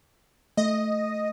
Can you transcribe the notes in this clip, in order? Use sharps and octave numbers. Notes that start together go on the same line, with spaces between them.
A3 D#5